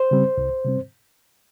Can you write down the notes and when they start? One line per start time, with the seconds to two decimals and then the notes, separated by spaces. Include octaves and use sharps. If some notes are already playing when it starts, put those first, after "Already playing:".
Already playing: C5
0.11 C#3 G3 C4
0.38 C2
0.65 C3 G3 C4